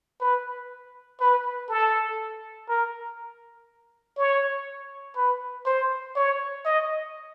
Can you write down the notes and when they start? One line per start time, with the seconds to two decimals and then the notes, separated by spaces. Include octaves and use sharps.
0.20 B4
1.20 B4
1.69 A4
2.69 A#4
4.18 C#5
5.16 B4
5.66 C5
6.16 C#5
6.65 D#5